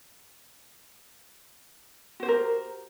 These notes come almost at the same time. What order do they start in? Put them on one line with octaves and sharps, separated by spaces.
F#4 C5 G4 A#4